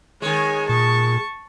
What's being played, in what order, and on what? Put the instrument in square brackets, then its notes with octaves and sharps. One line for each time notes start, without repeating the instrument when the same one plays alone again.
[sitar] D#3 G#3 [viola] C#5 G#5
[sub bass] A#2 [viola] A5 C#6